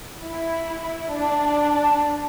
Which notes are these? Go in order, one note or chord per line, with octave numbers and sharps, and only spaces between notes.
E4
D4